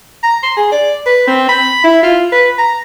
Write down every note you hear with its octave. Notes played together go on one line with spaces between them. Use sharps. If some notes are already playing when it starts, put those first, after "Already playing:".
A#5
C6
G#4
D5
B4
C4
B5
E4
F4
B4
A#5